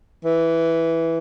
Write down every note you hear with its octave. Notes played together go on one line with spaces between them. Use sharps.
E3